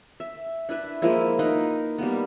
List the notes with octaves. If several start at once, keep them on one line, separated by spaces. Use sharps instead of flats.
E5
D4 E4 B4 E5
F3 G#3 A#3 E4
A#3 D#4 A#4 B4
G3 A#3 B3